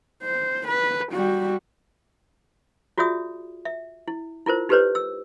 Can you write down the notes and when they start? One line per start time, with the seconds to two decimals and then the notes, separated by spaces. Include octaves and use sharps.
0.23 C5
0.68 B4
1.13 G3 F#4
2.98 F4 F#4 G#4 D5 E5 D#6
3.65 E5
4.08 E4
4.46 E4 F4 A#4 C5
4.69 D#4 G4 A4 B4 C5 D5
4.95 E6